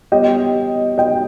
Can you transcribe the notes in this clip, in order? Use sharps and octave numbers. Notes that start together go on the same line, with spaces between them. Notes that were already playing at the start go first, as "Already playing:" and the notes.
G3 B3 G4 C#5 D#5 G5
D#5 G5